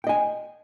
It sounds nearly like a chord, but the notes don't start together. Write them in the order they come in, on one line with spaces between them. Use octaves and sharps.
G5 D#5 G#5